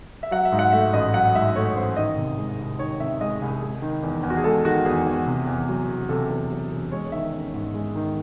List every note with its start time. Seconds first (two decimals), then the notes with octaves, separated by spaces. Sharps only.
0.23 E5
0.31 F#3 F#5
0.45 E5
0.52 G#2
0.59 F#5
0.73 A3 E5
0.93 A1 D#5
1.14 F#3 F#5
1.35 G#2 E5
1.55 A3 C#5
1.76 A1 C5
1.96 D#3 D#5
2.17 C3
2.38 G#3
2.59 C2
2.79 D#3 C#5
3.00 C3 E5
3.21 G#3 D#5
3.42 C2 G#4
3.62 G#3
3.82 D#3
4.03 E2
4.23 E2
4.30 F#4
4.37 G#4
4.44 G#3 A4
4.65 D#3 F#4
4.85 E2 G#4
5.07 E2
5.27 C3
5.47 E2
5.68 F#3
5.88 E1
6.09 C3 A4
6.30 E2
6.51 F#3
6.72 E1
6.92 G#3 C#5
7.12 D#3 E5
7.33 C#4
7.54 G#2
7.75 G#3
7.95 D#3